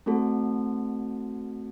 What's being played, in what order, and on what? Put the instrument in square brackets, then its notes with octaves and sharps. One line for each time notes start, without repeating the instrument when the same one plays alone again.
[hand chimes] A3 C4 F#4 A4